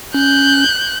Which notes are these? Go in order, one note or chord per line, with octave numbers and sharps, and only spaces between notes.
C#4 F#6 G6